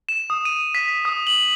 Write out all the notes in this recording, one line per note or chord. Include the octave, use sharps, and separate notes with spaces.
E7
D#6
D#7
B6
D#6
F#7